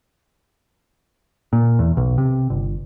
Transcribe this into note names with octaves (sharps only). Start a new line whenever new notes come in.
A#2
E2
B1
C3
G1